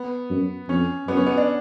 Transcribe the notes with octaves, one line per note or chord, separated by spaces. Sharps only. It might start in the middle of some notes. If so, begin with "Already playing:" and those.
Already playing: B3
F#2
F2 C#4
F#2 B3
C#4
B3
D4